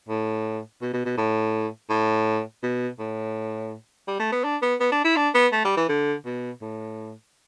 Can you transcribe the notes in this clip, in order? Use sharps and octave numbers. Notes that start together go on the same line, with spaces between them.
A2
B2
B2
B2
A2
A2
B2
A2
G3
A3
B3
D4
B3
B3
D4
E4
D4
B3
A3
G3
E3
D3
B2
A2